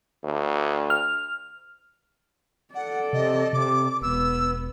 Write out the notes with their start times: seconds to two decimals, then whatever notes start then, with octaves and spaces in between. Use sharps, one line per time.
0.24 D2
0.90 F6
2.74 A4 D5 F#5
3.13 C3 D#5
3.53 C3 D6
4.02 E1 B3 E6